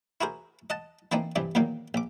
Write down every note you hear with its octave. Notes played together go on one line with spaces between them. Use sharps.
E4 F#4 G#4 A#4 C5
D#5 F#5 A5
E3 A#3 C4 D4 D#4
G2 C3 E3 D4
E2 A#2 D#3 F#3 A#3
A#1 D6